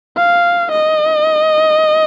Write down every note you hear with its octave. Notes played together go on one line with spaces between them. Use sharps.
F5
D#5